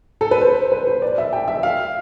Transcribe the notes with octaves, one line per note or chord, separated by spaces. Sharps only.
A4
B4
C5
B4
C5
D5
E5
G5
E5
F5